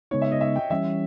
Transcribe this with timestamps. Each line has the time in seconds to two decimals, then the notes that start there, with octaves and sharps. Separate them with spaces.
0.11 C#3 G#3 B3 D#4 C#5
0.22 E5
0.31 D#5
0.41 E5
0.56 G5
0.70 E3 G3 C#4 E5